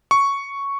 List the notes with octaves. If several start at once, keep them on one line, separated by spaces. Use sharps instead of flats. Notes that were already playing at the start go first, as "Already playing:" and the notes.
C#6